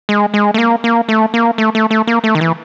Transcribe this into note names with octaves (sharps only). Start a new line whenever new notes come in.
G#3
G#3
A3
A#3
A#3
A3
A#3
A3
A3
A3
A#3
A3
D#3
E3